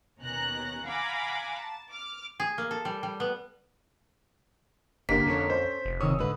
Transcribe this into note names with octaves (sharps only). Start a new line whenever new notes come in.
D#2 B2 C#4 A#5 F#6
F5 F#5 G#5 A#5 B5 D6
A5
D6 F6
G#4
A#3
A4
G3
G3
B3
F#1 D3 A#3 G4 B6
F2 C#4 A4 C#5
C5
F1
C3 D#3 C#5 D#6 E6
G#2 D3 B4